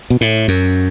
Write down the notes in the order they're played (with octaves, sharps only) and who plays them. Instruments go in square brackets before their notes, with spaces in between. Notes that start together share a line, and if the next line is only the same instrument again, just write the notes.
[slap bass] B2
A2
F#2